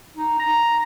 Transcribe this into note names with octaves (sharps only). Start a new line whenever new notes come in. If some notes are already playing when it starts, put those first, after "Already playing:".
D#4
A#5